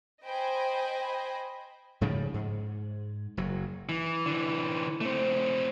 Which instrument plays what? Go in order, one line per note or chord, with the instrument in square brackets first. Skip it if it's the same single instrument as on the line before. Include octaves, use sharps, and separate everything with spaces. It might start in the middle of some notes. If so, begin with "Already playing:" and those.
[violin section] C5 D#5 G5 G#5 B5
[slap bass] G#2 C#3 F3 G3
G#2
F#1 F#3
[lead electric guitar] E3
D3 E3
A3 C4